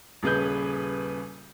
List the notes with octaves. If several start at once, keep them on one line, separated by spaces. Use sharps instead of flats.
D#1 C#3 G#4 B4 G6